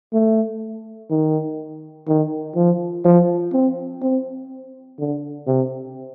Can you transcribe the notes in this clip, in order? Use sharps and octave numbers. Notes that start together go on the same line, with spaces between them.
A3
D#3
D#3
F3
F3
C4
C4
D3
C3